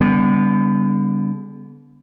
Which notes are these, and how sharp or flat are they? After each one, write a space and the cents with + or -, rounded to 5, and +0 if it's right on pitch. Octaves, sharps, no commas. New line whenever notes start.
D3 -35 G3 +25 B3 +0